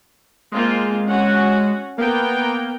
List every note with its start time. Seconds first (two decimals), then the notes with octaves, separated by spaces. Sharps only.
0.52 G#3 A#3 C4 F4
1.07 C#4 F#4 F#5
1.98 A#3 B3 A#4 G5